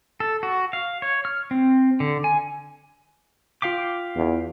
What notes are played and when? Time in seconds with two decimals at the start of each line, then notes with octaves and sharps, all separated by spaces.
0.20 A4
0.43 F#4
0.73 F5
1.02 C#5
1.25 F6
1.51 C4
2.00 D3
2.24 G#5
3.62 F4 F5 G5 D6 B6
4.16 E2